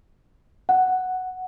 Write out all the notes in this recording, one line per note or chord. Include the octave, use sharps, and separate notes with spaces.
F#5